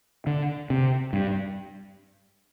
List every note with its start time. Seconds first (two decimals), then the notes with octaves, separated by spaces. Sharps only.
0.27 D3
0.70 C3
1.13 G2